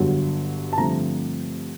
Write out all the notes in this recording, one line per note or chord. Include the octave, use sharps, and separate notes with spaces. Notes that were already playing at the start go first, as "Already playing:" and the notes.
Already playing: G1 G2 D3 F#3
A5
G2 D3 F3 A3 C4 A#5